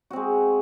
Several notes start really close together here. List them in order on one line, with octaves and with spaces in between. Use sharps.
F#4 C4 G#3